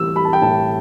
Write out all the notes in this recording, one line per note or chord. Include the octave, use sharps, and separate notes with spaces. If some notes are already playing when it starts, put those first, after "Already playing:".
Already playing: A1 G3 E6
G3 B5
A5
G5
A2 A5